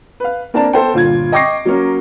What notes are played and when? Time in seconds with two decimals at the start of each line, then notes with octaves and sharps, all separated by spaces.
0.20 B4 F5
0.54 A#3 C4 D4 A#4 A5
0.73 B3 A4 C5 G5
0.94 G1 A#2 F4 G#6
1.32 D#5 G5 C#6 D6 A#6 C7
1.65 F#3 A#3 C#4